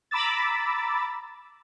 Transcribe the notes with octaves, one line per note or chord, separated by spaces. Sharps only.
A#5 B5 D6 E6 A6